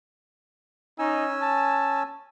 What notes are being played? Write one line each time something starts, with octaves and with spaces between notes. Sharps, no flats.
C#4 D#4 G#5 E6
A5